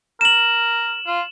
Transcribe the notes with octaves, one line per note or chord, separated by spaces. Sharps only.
A#4 E7 F#7
F4